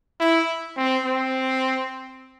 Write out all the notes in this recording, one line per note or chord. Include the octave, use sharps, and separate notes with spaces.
E4
C4
C4